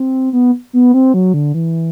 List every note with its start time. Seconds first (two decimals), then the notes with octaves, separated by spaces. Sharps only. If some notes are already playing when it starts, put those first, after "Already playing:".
Already playing: C4
0.33 B3
0.73 B3
0.94 C4
1.14 F#3
1.34 D3
1.54 E3